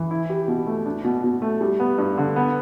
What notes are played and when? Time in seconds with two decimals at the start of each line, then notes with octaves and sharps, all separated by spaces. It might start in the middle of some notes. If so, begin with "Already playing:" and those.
Already playing: E3
0.11 E4
0.30 G4
0.48 B2
0.67 A3
0.86 D4
1.04 B2
1.24 B2
1.42 A3
1.61 G3
1.80 B3
1.98 G2
2.18 D3
2.36 B3